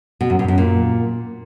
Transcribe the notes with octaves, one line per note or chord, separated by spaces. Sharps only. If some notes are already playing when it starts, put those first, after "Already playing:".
B2
F#2
G2
F#2
A#2